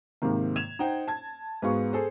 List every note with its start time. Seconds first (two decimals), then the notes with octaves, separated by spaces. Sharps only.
0.22 G#2 C3 D#3 A#3
0.56 G#6 E7 F7
0.79 D#4 C5 F#5 G5
1.07 A5 G#6
1.62 G#2 B3 F#4 G#4 F5 C#6
1.93 G#4 A4 C5